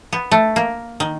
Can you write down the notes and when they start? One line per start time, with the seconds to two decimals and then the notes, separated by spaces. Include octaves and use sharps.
0.13 B3
0.32 A3
0.56 A#3
1.00 D#3